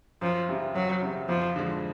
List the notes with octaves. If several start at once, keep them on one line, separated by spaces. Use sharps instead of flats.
F#2 F3
C#3 E3 G3 C4
F#2 F#3
C#3 E3 G3 C4
F2 F3
D3 F3 G#3